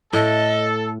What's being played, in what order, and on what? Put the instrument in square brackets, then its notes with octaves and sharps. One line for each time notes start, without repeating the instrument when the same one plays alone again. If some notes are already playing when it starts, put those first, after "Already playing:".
[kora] A2 [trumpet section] A4 [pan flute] D#5